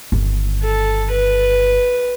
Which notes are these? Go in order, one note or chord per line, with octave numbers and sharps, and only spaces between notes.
G1 D#3
A4
B4